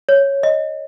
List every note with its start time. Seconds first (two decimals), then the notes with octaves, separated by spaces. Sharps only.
0.09 C#5
0.43 D#5